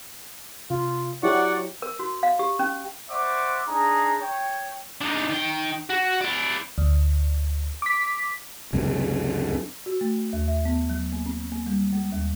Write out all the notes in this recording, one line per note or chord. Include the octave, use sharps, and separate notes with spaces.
C3 F4
F#3 E4 G4 D5 F#5 C#6
A#4
F#4
F5
G4
C#4
C5 D5 E5 F#5 C#6 D6
D4 D#4 G#4 A#5
C#5 G5
D4 D#4
D#3 G5
F#4
E4 D5
D2
D6 B6
C#2 F#2 C3
F#4
A3
D#2
E5
B3
F#3
A#3
C4
A#3
G3
G#3
D#2